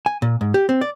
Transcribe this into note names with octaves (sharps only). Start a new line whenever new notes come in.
G#5
A#2
G#2
G4
C4
D5